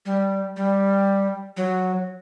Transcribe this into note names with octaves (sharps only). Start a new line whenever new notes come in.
G3
G3
F#3